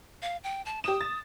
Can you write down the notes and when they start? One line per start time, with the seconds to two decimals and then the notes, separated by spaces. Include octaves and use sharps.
0.22 F5
0.44 G5
0.66 A5
0.84 G4 D#6 E7
1.01 A6